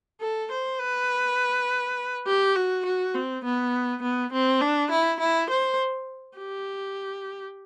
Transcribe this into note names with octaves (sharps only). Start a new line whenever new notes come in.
A4
C5
B4
G4
F#4
F#4
C4
B3
B3
C4
D4
E4
E4
C5
G4